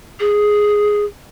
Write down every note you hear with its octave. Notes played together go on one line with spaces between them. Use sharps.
G#4